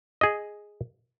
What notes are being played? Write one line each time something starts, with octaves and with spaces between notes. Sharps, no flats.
G#4 D#5